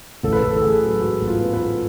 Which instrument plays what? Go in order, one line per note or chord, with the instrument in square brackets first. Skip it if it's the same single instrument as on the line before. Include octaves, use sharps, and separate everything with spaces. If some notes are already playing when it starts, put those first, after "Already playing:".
[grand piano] A1 A4
B4
A1 A4
A4
A1 G#4
F#3
G#2 F#4
A1
F4
B3
B4
G#2